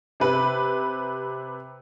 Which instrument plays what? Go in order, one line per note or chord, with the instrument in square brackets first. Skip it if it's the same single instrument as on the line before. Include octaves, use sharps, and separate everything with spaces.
[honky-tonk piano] C3 B4